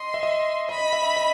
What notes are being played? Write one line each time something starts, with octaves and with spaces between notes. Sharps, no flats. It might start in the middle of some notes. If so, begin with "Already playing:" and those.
Already playing: D#5 C6
E5
D#5
D#5 B5
E5
D#5